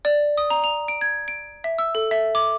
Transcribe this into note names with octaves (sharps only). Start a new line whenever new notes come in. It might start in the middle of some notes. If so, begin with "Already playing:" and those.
D5
D#6
A#5
F7
D7
G#6
D7
E5
E6
A4
E5
D6